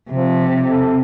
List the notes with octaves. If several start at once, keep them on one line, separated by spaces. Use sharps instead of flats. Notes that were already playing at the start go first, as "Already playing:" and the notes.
C3 F3
A4